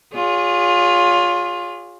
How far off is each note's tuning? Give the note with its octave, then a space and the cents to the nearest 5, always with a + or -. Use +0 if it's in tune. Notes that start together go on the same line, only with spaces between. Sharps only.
F4 +20 G#4 -25 C#5 +35